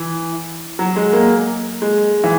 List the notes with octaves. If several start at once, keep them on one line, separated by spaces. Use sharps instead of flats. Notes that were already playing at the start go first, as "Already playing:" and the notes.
Already playing: E3
F#3
G#3
A#3
G#3
E3